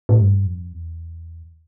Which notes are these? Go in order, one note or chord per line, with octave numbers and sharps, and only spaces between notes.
A2
G2
F2
E2